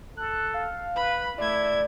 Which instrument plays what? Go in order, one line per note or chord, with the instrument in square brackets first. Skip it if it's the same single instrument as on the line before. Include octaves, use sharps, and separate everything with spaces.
[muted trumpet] A4 [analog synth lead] F#6
[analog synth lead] F5
[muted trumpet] B4 [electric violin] B5
[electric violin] A3 G#6 [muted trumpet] E4 [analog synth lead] D5